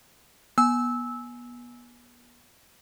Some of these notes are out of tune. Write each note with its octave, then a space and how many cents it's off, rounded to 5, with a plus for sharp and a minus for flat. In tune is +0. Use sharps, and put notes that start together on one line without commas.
B3 -30 G#5 +15 E6 -15